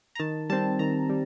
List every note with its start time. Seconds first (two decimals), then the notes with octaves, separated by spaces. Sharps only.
0.15 A#5
0.20 D#3 A5
0.50 G3 C4 A5
0.79 D#3 A#5
1.09 G3